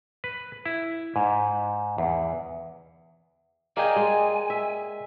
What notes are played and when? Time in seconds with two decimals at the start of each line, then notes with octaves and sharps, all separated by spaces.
0.24 B4
0.66 E4
1.16 G#2
1.98 E2
3.77 A#3 G#4 D5 D#5 G5 G#5
3.96 G#3
4.50 E5